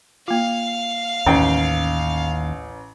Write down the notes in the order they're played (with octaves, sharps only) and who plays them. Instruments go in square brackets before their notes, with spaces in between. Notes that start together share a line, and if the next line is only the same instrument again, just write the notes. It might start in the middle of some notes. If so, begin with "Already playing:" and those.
[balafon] A#3 F4 [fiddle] F5
[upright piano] A1 G5 [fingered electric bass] D#2 [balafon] C#4